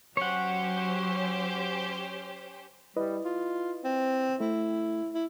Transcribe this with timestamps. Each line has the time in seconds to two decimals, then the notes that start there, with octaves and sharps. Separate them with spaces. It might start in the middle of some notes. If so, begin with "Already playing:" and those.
0.17 F#3 C#4 G4 C5 C#5 F#5
2.96 G3 E4 B4 D#5
3.25 F4
3.84 C4
4.40 A3 E4
5.14 E4